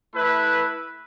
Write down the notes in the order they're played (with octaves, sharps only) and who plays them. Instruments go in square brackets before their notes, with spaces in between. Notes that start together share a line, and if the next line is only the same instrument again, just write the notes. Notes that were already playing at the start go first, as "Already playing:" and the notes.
[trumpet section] A3 E4 B4 E5